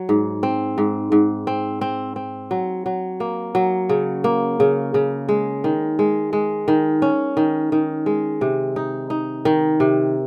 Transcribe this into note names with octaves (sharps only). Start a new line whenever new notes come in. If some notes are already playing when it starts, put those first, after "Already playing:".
Already playing: F#3
G#2
C4
G#2
G#2
C4
C4
C4
F#3
F#3
A#3
F#3
C#3
A#3
C#3
C#3
G#3
D#3
G#3
G#3
D#3
C#4
D#3
D#3
G#3
C3
D#4
D#4
D#3
C3